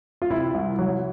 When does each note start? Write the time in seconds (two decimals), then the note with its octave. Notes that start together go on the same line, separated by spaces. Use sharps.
0.22 F4
0.31 C3 E4
0.54 C2
0.79 F#3